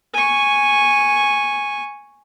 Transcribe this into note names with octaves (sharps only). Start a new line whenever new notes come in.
G#5 C#6